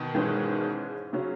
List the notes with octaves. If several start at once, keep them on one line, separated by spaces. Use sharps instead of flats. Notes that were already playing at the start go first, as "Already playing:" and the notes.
Already playing: B2 D#3
G#2 E3 G#3 C#4 G#4
C#3 F#3 C#4